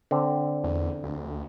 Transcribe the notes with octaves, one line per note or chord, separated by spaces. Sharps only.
D3 C4
E2
D2